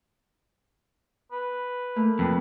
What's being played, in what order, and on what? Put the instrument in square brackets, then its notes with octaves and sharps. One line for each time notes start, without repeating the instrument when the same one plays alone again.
[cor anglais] B4
[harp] A3 A#3
[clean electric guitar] F2 [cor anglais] B4